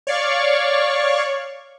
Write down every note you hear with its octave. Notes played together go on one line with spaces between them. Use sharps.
C#5 D5 F5 C#6